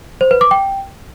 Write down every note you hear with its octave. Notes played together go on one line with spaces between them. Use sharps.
C5
B4
D6
G5